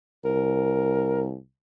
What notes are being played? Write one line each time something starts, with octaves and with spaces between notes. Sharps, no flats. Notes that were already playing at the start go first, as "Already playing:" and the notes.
C2 A#4